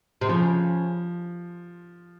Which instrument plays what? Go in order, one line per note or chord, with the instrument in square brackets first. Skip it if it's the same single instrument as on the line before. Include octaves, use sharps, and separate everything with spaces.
[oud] C3
[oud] C#3 [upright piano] F3